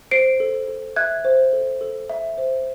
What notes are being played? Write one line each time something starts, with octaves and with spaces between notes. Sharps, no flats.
C5 C7 D7
A4
A4
E5 F#6 G#6
C5
A4
A4
E5
C5